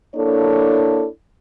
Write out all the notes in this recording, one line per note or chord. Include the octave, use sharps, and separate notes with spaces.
A#3 D4 E4 A4 C#5